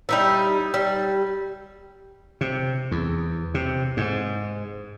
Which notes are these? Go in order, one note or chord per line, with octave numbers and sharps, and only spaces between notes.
G3 D#4 E4
G3
C3
E2
C3
G#2